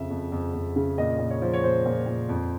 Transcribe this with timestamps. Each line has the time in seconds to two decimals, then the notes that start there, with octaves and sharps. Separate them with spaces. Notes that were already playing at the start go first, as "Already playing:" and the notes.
Already playing: F2 C#3 E5
0.10 F2
0.32 F2
0.54 F2
0.76 C#3
0.98 A#2 D#5
1.19 A#2
1.30 C#5
1.42 F3
1.53 C#5
1.63 A#2 C5
1.86 A#2
2.06 A#2
2.29 F2